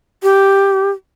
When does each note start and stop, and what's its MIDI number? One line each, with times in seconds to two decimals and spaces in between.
0.23 0.90 67